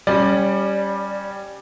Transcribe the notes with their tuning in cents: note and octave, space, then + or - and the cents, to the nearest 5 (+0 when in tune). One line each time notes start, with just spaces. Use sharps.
G3 +0 C#4 +0 D5 +20